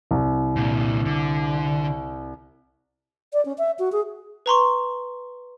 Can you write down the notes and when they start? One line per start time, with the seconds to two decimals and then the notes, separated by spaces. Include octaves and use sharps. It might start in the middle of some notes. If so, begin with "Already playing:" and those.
0.11 C2
0.56 A#2 D3
1.06 D3
3.33 D5
3.45 C#4
3.58 E5
3.79 F#4
3.92 G#4
4.46 B4 A#5 C6 C#6